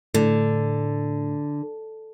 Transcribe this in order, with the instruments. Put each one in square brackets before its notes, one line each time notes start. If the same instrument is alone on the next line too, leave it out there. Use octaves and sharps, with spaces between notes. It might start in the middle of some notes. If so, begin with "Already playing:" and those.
[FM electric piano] A2 [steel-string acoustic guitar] D3